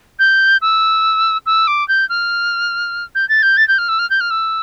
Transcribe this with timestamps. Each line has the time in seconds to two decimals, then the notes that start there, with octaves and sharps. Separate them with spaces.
0.19 G6
0.62 E6
1.46 E6
1.67 D6
1.88 G6
2.09 F6
3.15 G6
3.29 A6
3.43 G6
3.57 A6
3.68 G6
3.78 F6
3.89 E6
3.99 F6
4.10 G6
4.20 F6
4.31 E6